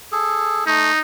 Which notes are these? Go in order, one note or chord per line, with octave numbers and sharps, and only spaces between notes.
G#4 A4
A3 D#4